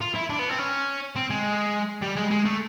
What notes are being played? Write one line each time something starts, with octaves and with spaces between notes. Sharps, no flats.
F4
E4
D4
B3
C4
C#4
C4
G#3
G3
G#3
G#3
A3